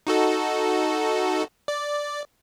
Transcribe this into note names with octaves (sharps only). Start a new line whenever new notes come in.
D#4 F#4 A4
D5